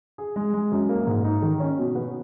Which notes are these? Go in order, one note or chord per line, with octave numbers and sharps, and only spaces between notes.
G#4
G#3
G#3
F#2
A#3
G#2
D#4
D#3
C#4
B2
B3